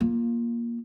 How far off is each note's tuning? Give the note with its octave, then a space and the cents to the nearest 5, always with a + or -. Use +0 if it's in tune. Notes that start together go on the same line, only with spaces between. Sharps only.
A#3 +10 F4 +0